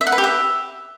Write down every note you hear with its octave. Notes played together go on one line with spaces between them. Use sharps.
E5
F#5
B4
G4
E5